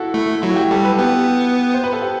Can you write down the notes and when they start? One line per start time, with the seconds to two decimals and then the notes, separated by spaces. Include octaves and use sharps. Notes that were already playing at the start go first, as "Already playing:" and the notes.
Already playing: E4 F#4 A4
0.14 A3 E4
0.42 F#3 E4
0.51 F#4
0.56 G4
0.71 G3 A4
0.84 B4
0.99 B3 G4
1.74 C5
1.84 B4
1.93 A4
2.02 G4